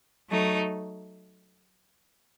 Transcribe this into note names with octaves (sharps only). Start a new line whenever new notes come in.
F#3 A3 D#4